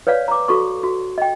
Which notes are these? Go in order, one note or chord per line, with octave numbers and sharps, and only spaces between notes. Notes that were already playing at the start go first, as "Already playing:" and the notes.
B4 C#5 D5 F5
A#5 D6
F#4 A4 C#6
F#4
D#5 G5